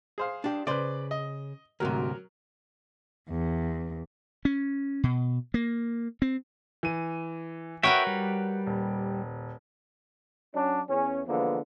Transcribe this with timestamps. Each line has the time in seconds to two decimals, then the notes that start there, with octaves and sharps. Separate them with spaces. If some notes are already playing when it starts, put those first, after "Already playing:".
0.18 G#4 C5 F5
0.44 D4 G4
0.67 C#3 B4 C5 D5
1.11 D#5
1.80 D2 G#2 C3 F#3 A#4
3.28 E2
4.45 C#4
5.03 B2
5.54 A#3
6.22 C4
6.83 E3 D#7
7.83 F#4 A#4 B4 C#5 E5 F#5 G5 C#6
8.07 G3
8.67 D#1
10.55 F#3 C#4 D4
10.89 E2 C#4
11.27 D3 E3 F3 G#3 A#3 B3